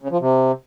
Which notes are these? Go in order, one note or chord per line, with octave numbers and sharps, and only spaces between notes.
C#3
F3
C3